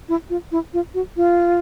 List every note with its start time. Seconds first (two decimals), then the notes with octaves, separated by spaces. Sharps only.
0.09 E4
0.30 F4
0.52 E4
0.74 F4
0.94 F#4
1.17 F4